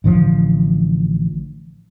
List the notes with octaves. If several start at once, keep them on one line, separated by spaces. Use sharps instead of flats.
A1 D3 D#3 F3